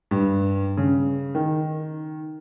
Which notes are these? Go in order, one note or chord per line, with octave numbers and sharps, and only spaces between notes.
G2
C#3
D#3